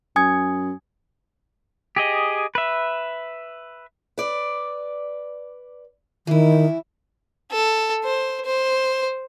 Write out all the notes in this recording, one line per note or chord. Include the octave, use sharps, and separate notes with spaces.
F#2 G#5 D#6 G#6
G4 G#4 D#5
B4 E5
B4 D5
D#3 E3 E4
A4
C5
C5